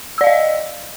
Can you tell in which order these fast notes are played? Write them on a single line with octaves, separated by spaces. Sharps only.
E6 D5 F5 D#5